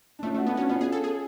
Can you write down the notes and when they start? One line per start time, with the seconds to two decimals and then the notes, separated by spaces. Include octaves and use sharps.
0.19 D4
0.23 A3 C#4 F4
0.34 A3
0.38 D4 F#4
0.47 B3
0.54 C#4 D4 F#4
0.69 B3 C#4 F4
0.81 G#4
0.92 A4
1.04 G#4